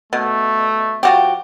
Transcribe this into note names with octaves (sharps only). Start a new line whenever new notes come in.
B2 A3
F3 F#4 G4